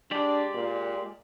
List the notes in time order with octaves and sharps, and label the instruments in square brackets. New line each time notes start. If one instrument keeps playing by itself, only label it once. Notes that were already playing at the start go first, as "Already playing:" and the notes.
[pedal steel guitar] G#3 G4 D5 [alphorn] D4
[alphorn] A#2